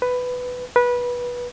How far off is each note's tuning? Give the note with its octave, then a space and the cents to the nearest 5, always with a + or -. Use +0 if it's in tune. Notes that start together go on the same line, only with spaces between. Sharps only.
B4 +10
B4 -20